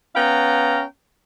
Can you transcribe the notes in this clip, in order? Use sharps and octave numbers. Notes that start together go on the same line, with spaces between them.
B3 C#4 F5 G5 A#5